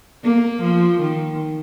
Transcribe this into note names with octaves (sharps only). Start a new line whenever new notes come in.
A#3
F3
D#3